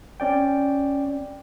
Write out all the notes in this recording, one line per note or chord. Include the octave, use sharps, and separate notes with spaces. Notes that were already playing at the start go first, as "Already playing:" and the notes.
C4 C#4 D5 G5